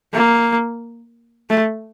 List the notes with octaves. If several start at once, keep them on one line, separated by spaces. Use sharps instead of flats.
A#3
A3